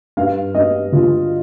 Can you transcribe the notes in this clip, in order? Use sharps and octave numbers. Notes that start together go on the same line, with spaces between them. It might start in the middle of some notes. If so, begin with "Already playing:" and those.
G2 F5
G2 D#5
D3 F4